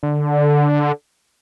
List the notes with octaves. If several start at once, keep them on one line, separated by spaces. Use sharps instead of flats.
D3